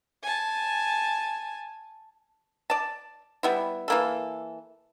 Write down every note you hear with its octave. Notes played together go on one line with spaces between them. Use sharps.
G#5 A5
D5 A5
G3 B3 E4
E3 A#3 A4